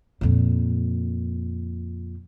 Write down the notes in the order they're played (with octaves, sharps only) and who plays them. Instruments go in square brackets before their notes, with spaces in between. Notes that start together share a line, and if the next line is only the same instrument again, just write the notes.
[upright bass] F2 A#2